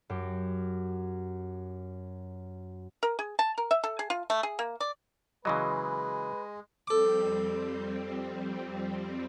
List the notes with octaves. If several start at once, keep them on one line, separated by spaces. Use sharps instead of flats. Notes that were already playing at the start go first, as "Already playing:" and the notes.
F#2 G4
A#4
G#4
A5
A#4
E5
A4
G#4
F4
A3
G#4
A#3
D5
C#3 E3 F#3 G#3 B4 D#5 C6
F2 G3 C4 A4 D6